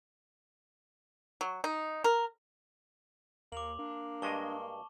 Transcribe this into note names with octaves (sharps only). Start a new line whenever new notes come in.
F#3
D#4
A#4
D#2 A#3 D6 F7 F#7
A#3 D4
G2 G#3 D#5 A5 C#6 G7